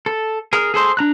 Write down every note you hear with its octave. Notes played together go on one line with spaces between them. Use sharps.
A4
G#4 A#4
G#4 A4 C5
D4 A#5 F#6